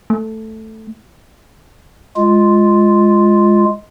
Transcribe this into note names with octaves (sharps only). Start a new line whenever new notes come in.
A3
G#3 F4